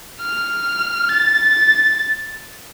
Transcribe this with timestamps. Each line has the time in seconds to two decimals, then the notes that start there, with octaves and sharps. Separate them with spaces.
0.21 F6
1.09 A6